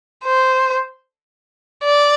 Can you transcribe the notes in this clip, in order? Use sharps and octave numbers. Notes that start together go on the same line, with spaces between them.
C5
D5